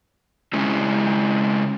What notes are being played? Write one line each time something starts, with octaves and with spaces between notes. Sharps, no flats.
C#3 G#3 C4 C#4 E4